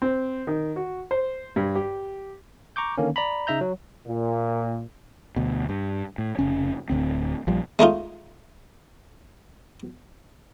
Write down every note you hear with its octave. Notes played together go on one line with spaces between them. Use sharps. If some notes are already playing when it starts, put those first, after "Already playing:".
C4
D#3
F#4
C5
G2
G4
A#5 C#6 D6 G6
D3 D#3 A#3 C#4
D5 A#5 B5
C#3 D#4 E5 A#5 G6
F#3
A#2
D2 B2
G2
A2
F1 C#3 C#4
D1 G#1 D2 C4
A#1 F3 G3
G#3 A3 D#4 F4